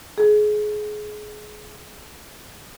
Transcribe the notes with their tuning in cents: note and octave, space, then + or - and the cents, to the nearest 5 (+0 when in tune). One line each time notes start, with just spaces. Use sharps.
G#4 +25